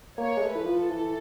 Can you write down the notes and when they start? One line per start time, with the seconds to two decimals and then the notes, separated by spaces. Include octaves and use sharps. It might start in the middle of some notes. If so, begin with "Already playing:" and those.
0.18 A#3 C#5
0.37 G#3
0.42 A3
0.50 B4
0.55 E3
0.66 F3
0.82 A4
0.89 E3